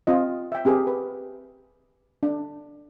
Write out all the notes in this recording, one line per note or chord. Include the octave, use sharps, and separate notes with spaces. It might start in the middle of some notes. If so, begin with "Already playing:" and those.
C4 F4 D#5
E5 G5
C4 G4 G#4 A#4
B4
D4